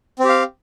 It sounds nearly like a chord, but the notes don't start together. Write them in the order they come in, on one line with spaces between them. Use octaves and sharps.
C4 G4 F5